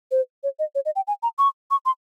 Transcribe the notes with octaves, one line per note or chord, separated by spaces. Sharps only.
C5
C#5
D#5
C#5
D#5
G5
G#5
A#5
C#6
C#6
C6